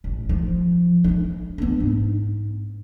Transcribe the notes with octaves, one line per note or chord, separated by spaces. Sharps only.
A1
F3
D#4 E4
B3 D4
G#2